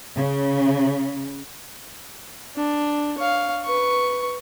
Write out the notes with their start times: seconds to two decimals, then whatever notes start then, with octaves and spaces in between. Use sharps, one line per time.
0.15 C#3
2.57 D4
3.18 C#5 F5
3.64 B4 C#6